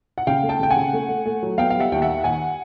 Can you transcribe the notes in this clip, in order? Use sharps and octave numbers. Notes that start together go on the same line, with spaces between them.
F#5
C#3 F5 G5
A3
G5 A5
C#3 G5
F#5 G#5
C#3
A3
A3
A3
F#3
B3 F5 G5
G3 F5
E5 F#5
D#2 G5
E5 F#5
D#3
D#2 F#5 G#5